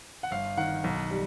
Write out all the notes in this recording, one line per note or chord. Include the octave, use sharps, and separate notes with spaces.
F#5
G1 F5
D#3 F#5
B1
G3